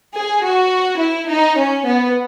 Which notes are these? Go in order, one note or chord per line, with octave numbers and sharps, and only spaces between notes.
G#4
F#4
E4
D#4
C#4
B3